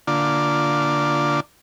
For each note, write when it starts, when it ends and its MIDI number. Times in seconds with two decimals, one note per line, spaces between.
0.07 1.40 50
0.07 1.40 58
0.07 1.40 62
0.07 1.40 65
0.07 1.40 74